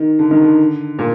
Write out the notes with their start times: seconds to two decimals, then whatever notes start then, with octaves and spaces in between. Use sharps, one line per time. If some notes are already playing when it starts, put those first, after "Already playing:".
Already playing: D#3
0.19 D3
0.31 D#3
0.42 D3
0.99 A#2